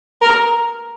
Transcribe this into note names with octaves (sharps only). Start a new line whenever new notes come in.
A#4